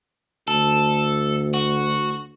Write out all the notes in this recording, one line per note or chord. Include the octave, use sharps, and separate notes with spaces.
D2 A4
F#4